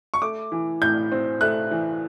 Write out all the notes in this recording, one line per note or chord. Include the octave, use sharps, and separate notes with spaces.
C#6
A3 D6
E3
A2 G6
C4
A3 F#6
E3